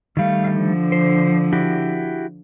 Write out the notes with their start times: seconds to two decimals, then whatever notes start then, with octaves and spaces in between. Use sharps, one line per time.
0.17 D#3 G3 A3 F5
0.53 D3 F3
0.92 C5
1.53 E4 F#4 G4